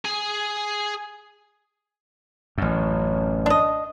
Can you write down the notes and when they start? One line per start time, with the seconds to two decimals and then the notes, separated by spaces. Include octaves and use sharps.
0.05 G#4 G#5
2.58 A1 F#2
3.46 D4 D#5